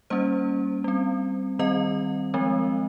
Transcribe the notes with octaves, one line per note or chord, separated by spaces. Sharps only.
G3 A#3 C#4 C5
G3 C4
D#3 G3 C4 D#5
F3 G#3 C4